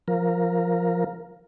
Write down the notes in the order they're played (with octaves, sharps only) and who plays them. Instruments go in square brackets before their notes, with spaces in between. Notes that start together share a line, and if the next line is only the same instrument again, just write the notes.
[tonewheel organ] F3 A#4